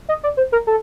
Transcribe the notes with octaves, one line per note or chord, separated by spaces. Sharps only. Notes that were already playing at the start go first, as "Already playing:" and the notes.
D#5
D5
C5
A#4
A4